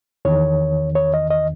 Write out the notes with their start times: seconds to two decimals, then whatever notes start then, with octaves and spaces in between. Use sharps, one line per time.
0.25 E2 D#3 C#5
0.95 C#5
1.14 D#5
1.30 D#5